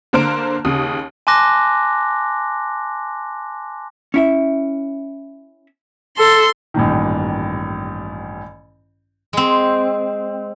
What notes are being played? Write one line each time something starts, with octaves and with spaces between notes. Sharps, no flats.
D3 A#3 C5 F6 D7
D#2 C#3 D#6
G#5 A5 C6 D6 F#6 A#6
C#4 E4 E5
A4 C6
A1 G2 A#2 D#3
G#3 C4